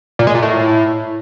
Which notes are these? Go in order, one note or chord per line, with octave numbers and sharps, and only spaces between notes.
A#2
G#3
A#2
A2